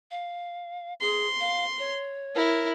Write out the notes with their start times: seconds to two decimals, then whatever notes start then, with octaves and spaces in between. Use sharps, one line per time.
0.11 F5
1.01 G#4 C6
1.40 F5
1.79 C#5
2.35 E4 A#4